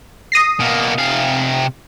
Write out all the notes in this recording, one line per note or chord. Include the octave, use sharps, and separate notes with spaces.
D#6 A#6 C7
B2 A#3
C3 F5